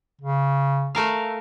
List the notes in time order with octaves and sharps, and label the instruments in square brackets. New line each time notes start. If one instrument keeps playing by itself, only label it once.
[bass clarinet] C#3
[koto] A3 A#4 F5